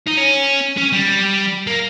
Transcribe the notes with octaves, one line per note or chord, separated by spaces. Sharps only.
D#4
C#4
C#4
G3
A#3